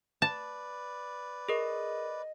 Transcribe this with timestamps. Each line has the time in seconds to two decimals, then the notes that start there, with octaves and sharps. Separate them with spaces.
0.22 B4 D5 A5
1.49 G#4 A#4 D#5